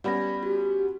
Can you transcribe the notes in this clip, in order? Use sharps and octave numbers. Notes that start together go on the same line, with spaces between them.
G3 B3 C#4 D5 B5 A#6
F#4 G4